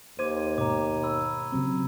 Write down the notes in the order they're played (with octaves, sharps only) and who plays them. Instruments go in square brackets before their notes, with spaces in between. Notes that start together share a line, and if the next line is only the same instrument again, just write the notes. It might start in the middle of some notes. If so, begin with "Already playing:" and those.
[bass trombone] D#2 [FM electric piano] C5 [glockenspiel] D6 G#6 D#7
[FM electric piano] G#2 B2 [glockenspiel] A#5 D6
[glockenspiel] B5 E6
[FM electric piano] C#3 F#3 C4